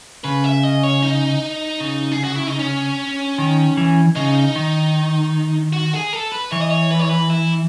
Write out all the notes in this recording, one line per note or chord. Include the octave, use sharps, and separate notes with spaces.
C#3 B4
E5
D#5
C#5
D#4
C#3
G#4
F#4
E4
D#4
C#4
D#3
E3
C#3 D#4
D#3
F#4
G#4
A4
B4
E3 C#5
D#5
C#5
B4
C#5
B4
E4